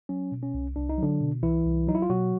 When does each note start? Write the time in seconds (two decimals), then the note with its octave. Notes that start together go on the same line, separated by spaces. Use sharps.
0.09 F#3 C#4
0.32 B2
0.43 C#4
0.54 C2
0.76 C2 D4
0.89 D#4
0.98 D3 F#3 D4
1.21 B2
1.43 C2 E3 E4
1.65 C2
1.88 F#3 D#4
1.95 E4
2.02 F4
2.09 B2 F#3 F#4